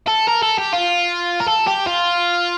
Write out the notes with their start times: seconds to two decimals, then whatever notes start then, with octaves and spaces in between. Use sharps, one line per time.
0.08 A4
0.28 A#4
0.43 A4
0.58 G4
0.73 F4
1.40 A#4
1.48 A4
1.67 G4
1.87 F4